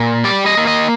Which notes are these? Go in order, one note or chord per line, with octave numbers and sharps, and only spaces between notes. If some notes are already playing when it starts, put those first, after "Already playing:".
Already playing: A#2
G3 D5
D#5
A#3
D#5